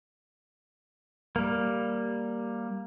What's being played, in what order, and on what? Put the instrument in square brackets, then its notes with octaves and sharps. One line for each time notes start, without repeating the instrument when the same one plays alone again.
[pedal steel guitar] G3 A#3